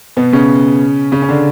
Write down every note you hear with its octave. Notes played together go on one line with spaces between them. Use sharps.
B2 B3
C#3 C#4
C#3 C#4
C#4
D3 D4